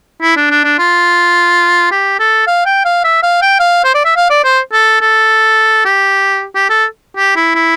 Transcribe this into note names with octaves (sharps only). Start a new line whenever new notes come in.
E4
D4
D4
D4
F4
G4
A4
F5
G5
F5
E5
F5
G5
F5
C5
D5
E5
F5
D5
C5
A4
A4
G4
G4
A4
G4
E4
E4